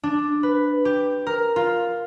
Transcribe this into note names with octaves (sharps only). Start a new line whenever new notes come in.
D4
B4
G4
A#4
F4